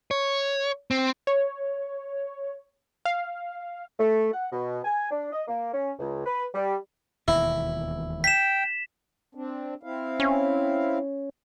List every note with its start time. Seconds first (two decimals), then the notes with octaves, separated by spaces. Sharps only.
0.11 C#5
0.91 C4
1.27 C#5
3.05 F5
3.99 A3
4.32 F#5
4.52 B2
4.85 G#5
5.11 D4
5.32 D#5
5.48 A#3
5.73 C#4
5.99 C#2
6.26 B4
6.54 G3
7.28 E1 D#2 B2 E4
8.24 G5 B6 E7
9.35 C4 D4
9.83 C4 E4 F5
10.20 C#4